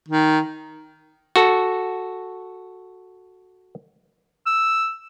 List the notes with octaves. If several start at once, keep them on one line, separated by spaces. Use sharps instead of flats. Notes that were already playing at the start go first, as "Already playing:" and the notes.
D#3
F#4 A4
E6